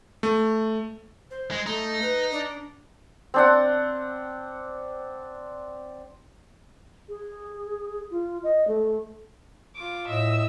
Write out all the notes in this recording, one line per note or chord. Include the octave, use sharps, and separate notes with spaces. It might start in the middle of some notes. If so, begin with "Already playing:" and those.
A3
C5
G#3
A3 D#4
B4
D4
C4 D4 F#5
G#4
F4
D#5
A3
F4 D6
A2 D#5 E5 E6